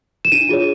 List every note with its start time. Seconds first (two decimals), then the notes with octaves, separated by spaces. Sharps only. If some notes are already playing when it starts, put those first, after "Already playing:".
0.25 E7
0.32 D4 D#7
0.49 F4 G#4 C#5